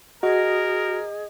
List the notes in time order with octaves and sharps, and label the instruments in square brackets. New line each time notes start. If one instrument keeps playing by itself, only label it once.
[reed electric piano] F#4 [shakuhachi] G#4 [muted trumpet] A#4 [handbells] D#5